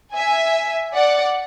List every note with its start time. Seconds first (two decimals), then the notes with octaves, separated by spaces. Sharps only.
0.13 E5 G#5
0.94 D5 F#5